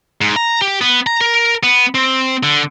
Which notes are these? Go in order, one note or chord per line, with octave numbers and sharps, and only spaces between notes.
G#2
A#5
G4
B3
A#5
A#4
B3
C4
D3